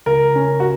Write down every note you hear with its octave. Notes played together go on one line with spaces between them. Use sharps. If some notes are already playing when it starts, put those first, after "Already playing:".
C#2 A#4
C#4
F#4